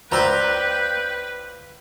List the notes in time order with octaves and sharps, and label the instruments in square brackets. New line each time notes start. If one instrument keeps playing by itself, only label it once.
[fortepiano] C#2 A#5 E6 [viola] B4 [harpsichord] C5 D5 C6 [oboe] G5